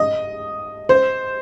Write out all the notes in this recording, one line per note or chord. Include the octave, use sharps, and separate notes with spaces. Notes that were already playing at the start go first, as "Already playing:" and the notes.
Already playing: D#5
C5